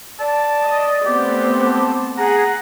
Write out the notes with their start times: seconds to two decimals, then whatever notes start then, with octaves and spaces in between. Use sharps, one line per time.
0.20 D5 A5
0.65 D#5
1.06 A3 B3 C4 G4
1.65 A5
2.18 G#4 F#5 A#5